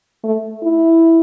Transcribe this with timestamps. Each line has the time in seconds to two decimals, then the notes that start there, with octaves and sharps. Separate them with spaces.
0.24 A3
0.63 E4